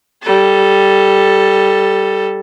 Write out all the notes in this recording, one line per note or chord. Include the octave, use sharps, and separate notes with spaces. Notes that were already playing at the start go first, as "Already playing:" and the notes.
G3 A4